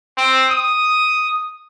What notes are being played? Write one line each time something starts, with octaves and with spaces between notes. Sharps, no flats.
C4
D#6